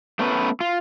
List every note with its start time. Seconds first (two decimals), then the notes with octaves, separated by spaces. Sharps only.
0.19 A3 B3 C#4 B4
0.60 F4